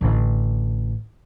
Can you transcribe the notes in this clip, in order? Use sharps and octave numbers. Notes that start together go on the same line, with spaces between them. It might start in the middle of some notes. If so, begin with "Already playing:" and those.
A1 D3